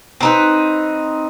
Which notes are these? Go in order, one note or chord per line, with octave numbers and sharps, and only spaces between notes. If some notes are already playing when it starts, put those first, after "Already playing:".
C4 D#4 B4